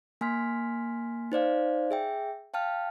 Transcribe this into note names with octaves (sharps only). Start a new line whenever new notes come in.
A#3 G#5 C6 F6 B6
D#4 C5 D5 F5
G#4 E5 G5
F5 G5 A5 F6